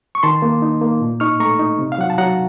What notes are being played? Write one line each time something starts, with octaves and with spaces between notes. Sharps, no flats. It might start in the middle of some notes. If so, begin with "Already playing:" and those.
C#6
D#3 A5 C6
A#3
D#4
A#3
A#2
D#4 C#6 F6
A3 A#5 C#6
D#4
C3
F5
F#3 F#5
A5
F#3 F#5 A#5